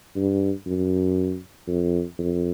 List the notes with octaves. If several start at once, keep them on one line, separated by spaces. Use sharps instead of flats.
G2
F#2
F2
F2